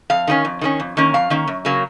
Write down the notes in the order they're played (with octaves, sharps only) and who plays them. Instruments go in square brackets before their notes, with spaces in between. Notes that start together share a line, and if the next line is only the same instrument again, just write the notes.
[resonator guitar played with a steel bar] F2 F5
D#3 A#3 C#4
F2
D#3 A#3 C#4
F2
D#3 A#3 C#4
F2 F5
D#3 A#3 C#4
F#2
C#3 F#3 A#3